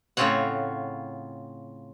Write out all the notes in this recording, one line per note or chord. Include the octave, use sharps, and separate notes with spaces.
A2 C#3 C4 F4 C#5 F#5